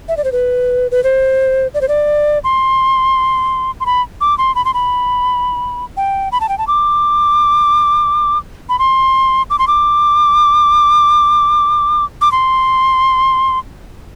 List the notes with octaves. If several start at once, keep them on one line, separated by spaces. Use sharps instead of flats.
E5
D5
C5
B4
B4
C5
D5
C5
D5
C6
C6
B5
D6
C6
B5
C6
B5
G5
B5
A5
G5
A5
D6
B5
C6
D6
C6
D6
D6
C6